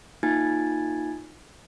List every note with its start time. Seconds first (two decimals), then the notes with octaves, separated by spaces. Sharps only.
0.23 A#3 D#4 F4 G#5 G#6 A6